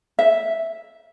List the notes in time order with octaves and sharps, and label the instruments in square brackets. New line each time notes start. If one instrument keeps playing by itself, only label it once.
[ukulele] E5